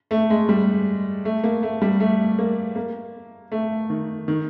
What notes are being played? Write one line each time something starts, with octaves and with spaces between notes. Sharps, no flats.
A3
G#3
G3
A3
A#3
A3
G3
A3
A#3
A#3
A3
D#3
D#3